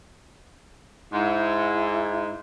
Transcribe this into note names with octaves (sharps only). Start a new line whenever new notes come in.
G#2 E4